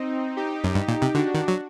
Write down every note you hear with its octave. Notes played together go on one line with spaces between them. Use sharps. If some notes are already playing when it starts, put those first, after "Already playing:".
Already playing: C4 D#4
D#4 G4
F#2
G2
A#2
C3
D3 D4 F#4
D#3
F#3